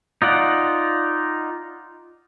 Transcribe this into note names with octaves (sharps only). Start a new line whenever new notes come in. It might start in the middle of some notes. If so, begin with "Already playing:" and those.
D#4 F4 D5 F#5